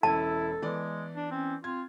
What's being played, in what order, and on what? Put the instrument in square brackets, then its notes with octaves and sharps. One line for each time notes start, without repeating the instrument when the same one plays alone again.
[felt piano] E1 C#4 G#6 [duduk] E4 [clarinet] A4 [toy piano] A5
[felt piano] E3 B3 D5 [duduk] G#3
[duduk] D4
[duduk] C4 [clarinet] C#4
[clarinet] C4 [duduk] F4 [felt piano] G#6